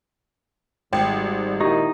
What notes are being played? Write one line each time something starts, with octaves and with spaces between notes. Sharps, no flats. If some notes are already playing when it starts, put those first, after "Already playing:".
G#1 G#2 G3 G5
A#2 D#3 D#4 E4 G4